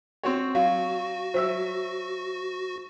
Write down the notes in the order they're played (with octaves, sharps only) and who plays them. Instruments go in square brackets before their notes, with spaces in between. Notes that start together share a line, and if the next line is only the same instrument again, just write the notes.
[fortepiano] C4 F#4 C#5
[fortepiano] F#3 [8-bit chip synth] F#4 [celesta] F5
[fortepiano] F#3 E5 E6 [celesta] C5